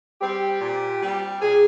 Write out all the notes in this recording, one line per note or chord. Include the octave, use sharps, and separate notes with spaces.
G3 C4 G4
A#2
G3 C4
A#2 G#4